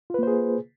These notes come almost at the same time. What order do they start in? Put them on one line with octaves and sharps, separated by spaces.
F4 B4 A#3 C5 G#4